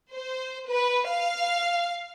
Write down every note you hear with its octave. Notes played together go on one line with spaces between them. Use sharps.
C5
B4
F5